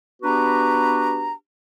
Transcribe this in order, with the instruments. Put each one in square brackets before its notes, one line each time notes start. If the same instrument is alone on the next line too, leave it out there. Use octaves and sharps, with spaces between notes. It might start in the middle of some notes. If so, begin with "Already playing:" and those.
[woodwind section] B3 D4 F#4 G4 B4 A#5